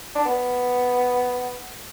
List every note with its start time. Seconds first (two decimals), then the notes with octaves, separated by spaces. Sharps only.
0.15 D4
0.25 B3